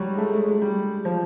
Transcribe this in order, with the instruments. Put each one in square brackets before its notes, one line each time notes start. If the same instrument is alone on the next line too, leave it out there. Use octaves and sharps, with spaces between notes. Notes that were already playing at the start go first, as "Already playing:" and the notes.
Already playing: [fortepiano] F#3 G3
G#3
A3
G#3
G#3
G3
F3